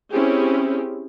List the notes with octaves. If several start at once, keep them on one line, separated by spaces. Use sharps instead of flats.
C4 C#4 E4 G4 G#4